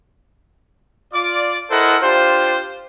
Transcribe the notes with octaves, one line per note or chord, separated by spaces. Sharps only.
F4 D5 D6
E4 A4 A#4 C5 D#5 F#5
D4 F4 G4 C5